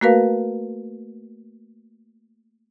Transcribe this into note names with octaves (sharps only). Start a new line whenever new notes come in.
A3 A#3 F#4 A#4 B4 F5